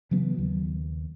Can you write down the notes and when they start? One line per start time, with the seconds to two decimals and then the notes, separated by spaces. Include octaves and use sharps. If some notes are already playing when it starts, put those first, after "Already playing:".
0.11 C#3 E3 F#3 B3
0.38 D#2